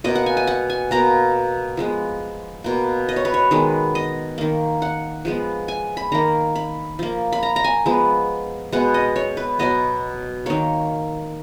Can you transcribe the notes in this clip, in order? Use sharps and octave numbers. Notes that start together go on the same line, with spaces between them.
B2 A#3 D#5
F#5
G#5
G#5
F#5
G#5
B2 A#3 A#5
F3 G#3 B3
B2 A#3
D#5
C#5
B4
C#5
D#3 G#3 B3
D#5
D#3 A#3
F#5
F3 G#3 B3
G#5
B5
D#3 A#3 A#5
B5
F3 A#3
B5
A#5
A#5
G#5
F3 G#3 B3
B2 G#3 B3 F#5
D#5
C#5
B4
B2 F#3 B3 D#5
D#3 A#3 C#5